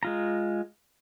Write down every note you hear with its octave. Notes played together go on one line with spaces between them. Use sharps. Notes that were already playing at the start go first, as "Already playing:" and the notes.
G#3 F4 A#5